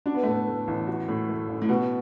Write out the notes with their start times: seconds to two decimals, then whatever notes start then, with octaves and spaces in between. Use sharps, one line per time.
0.06 D4 F#4
0.14 B3
0.23 A3
0.27 A2 B3
0.47 A3
0.68 A1
0.88 F#4
1.09 A2
1.29 A3
1.48 A1
1.62 A2
1.69 B2 F#4